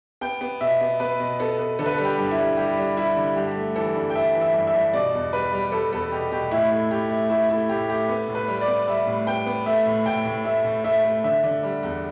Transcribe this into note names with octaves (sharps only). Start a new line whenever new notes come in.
B3 G5
B3
B2 E5
B3
B3 B4
B2
B3 A4
B3
D3 A4
B4
A4
G3
G4
G2
E4
G3
G3 G4
G3
G3 E4
D3
G2 G4
A3
E3 A4
G2
G5
E3 E5
E3
E5
G2
E5
G2
B2 D5
E2
G3 B4
G3
G3 A4
E2 A4
B2 G4
B2 G4
A2 E4
A3
A3 G4
A3
A3 E4
A3 E4
A2 G4
A3 G4
B3
A2
B4
G3
D5
B3
G3 E5
A2
B3 G5
B3
A3 E5
A2
A2 G5
A2
A3 E5
A2
A3 E5
A3
D3 E5
D3
G3
E2